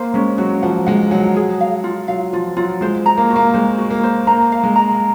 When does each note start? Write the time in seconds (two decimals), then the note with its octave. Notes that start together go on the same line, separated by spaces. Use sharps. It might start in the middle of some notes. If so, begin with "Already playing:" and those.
Already playing: A#3 C5
0.14 G#3 C#4
0.38 F#3 F#4
0.62 F3 F#5
0.86 G#3 F#5
1.11 F#3 F#5
1.36 G#4
1.61 F5
1.84 F4
2.08 F#3 F5
2.33 F3 F4
2.57 F#3 F4
2.81 G#3 C5
3.06 A#5
3.17 A#3
3.30 F#4
3.36 A#3
3.54 G#3 C5
3.78 F#4
3.90 A#3
4.04 C5
4.27 A#3 A#5
4.52 F5
4.64 G#3
4.76 A#5